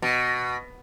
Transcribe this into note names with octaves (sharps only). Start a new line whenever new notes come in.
B2